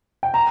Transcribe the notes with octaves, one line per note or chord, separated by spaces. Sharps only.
G5
A#5